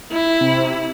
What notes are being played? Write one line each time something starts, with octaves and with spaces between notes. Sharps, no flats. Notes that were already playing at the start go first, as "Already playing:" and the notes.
E4
C3